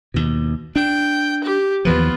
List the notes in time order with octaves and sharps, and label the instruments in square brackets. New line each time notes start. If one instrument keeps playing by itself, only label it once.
[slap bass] D#2 B2
[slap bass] D4 [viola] G5
[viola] G4
[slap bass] D#2 E3 F3 [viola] B3 F4